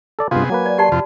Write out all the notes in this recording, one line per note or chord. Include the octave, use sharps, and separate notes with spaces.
A4 D5 A5
G2 C3 B3 F4 G#4
F#3 A#3 B4 G#5
D5
G4 D5 A5 C6
F2 C3 F4 F#4